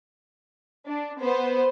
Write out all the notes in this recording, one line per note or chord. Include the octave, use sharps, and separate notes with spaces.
D4
B3 C5